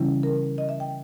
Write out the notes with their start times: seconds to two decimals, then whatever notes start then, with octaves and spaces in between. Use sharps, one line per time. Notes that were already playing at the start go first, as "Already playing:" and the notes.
Already playing: C#3 E3 G3 C#4 E4
0.23 A#4
0.58 D#5
0.69 E5
0.80 G5